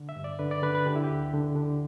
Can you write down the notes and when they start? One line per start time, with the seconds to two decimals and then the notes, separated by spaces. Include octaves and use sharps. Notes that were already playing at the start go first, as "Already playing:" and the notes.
Already playing: D3
0.09 E5
0.16 G2
0.24 D5
0.39 D3 B4
0.51 D5
0.63 D3 B4
0.75 B4
0.86 D3 G4
0.96 E4
1.04 G4
1.10 D2
1.34 D3
1.56 D3